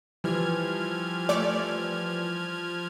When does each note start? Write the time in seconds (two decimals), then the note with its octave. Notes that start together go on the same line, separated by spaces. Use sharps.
0.24 E3 F3 G3 F6 G#6
1.29 A3 D5